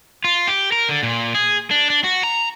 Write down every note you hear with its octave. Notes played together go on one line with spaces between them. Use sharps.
F4
G4
A#4
D3
A#2
G#4
D4
D4
F#4
A#5